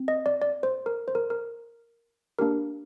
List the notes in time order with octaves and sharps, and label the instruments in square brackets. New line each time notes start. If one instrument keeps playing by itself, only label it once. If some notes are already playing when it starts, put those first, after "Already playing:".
Already playing: [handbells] C4
D#5
D5
D5
C5
A#4
C5
A#4
A#4
A#3 D4 G4 A#4